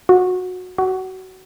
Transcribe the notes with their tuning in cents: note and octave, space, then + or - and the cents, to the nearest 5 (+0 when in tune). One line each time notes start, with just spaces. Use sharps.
F#4 -20
F#4 +20